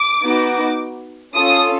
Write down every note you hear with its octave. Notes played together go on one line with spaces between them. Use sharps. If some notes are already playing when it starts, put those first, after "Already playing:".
Already playing: D6
B3 D#4 F#4
C#4 F4 A4 D#6